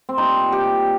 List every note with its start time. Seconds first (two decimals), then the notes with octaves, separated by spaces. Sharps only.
0.09 C4
0.17 A#2 G3 D#4
0.52 G4